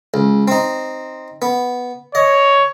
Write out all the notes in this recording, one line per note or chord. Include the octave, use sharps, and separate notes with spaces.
C#2
C4 D#4
B3
C#5 D#5